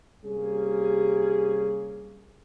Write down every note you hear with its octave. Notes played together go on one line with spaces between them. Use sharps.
C3 G3 A#3 C#4 G#4